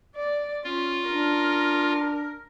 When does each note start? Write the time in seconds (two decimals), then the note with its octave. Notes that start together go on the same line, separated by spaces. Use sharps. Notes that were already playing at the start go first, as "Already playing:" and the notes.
0.15 D5
0.64 C#4 F4
1.08 D4 A#4